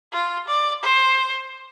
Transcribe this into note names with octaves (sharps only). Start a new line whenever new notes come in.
F4
D5
C5